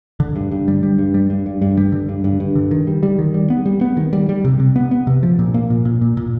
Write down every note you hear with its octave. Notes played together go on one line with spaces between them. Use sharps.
D3
G2
G2
G3
G3
G2
G3
G2
G2
G2
G3
D3
G2
G2
G2
D3
D#3
G3
G3
D#3
G3
B3
G3
B3
D#3
G3
G3
C3
C3
B3
B3
C3
F3
A#2
A#3
A#2
A#2
A#2
A#2